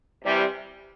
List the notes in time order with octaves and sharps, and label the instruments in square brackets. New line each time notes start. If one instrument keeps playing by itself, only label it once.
[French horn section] C3 E3 G3